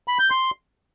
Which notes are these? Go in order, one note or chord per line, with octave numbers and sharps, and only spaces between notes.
B5
G6
C6